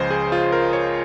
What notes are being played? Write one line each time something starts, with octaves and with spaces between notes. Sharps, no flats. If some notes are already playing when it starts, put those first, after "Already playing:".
Already playing: C#2 C#3 F3 C5 D#5
G#4
F4
A#4
C#5